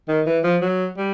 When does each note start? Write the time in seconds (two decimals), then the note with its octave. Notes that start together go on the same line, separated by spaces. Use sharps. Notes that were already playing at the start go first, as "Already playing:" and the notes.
0.08 D#3
0.26 E3
0.44 F3
0.61 F#3
0.97 G3